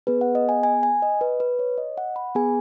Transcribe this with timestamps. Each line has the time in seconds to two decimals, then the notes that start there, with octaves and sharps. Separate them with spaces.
0.07 B3 G#4 B4
0.21 F#5
0.35 D#5
0.49 G#5
0.63 G#5
0.83 G#5
1.02 D#5
1.21 B4
1.40 B4
1.59 C#5
1.78 D#5
1.97 F#5
2.16 B5
2.35 B3 G#4 G#5